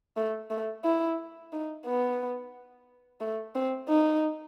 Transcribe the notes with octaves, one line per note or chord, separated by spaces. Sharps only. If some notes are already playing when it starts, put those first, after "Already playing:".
A3
A3
E4
D#4
B3
A3
C4
D#4